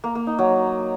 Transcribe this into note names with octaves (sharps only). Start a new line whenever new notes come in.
A#3
A#3
D#4
F#3